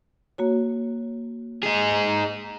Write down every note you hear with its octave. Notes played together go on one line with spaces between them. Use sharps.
A#3 F#4 C#5
D#4 G#4
A#5